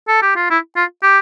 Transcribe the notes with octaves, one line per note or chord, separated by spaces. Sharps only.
A4
G4
F4
E4
F4
G4